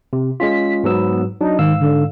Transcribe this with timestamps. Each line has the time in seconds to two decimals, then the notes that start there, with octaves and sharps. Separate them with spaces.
0.13 C3
0.40 G#3 C#4 F4 B6
0.84 G#2 F#3 B3 E6
1.41 F#3 D4 D#4
1.59 G#2 D#3 F5 E6
1.81 D3